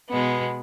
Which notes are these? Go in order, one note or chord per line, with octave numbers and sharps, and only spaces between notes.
B2 G#3 B3